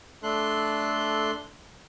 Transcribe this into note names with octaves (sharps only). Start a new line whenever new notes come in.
A3 D4 A4 C6 F#6